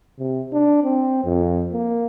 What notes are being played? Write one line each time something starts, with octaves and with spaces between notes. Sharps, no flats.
C3
D4
C4
F2
A#3